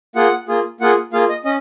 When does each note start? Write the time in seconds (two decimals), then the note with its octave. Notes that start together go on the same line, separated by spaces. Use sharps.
0.15 A#3 F4 G#4 F#5
0.48 A#3 F4 G#4
0.80 A#3 F4 G#4 F#5
1.13 A#3 F4 G#4 F5
1.29 D#5
1.45 C#4 D#5